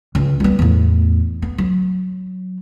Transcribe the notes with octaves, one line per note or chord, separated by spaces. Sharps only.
C#2
G3 B3
E2 A2
B3
F#3